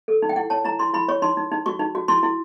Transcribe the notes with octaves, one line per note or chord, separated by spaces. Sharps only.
A4
D#4
G5
E4 F#5
C#5 A5
E4 A#5
E4 C6
E4 B5
C#5 C#6
D#4 C6
D#4
D#4
F#4 C#6
D#4
F#4
E4 C6
E4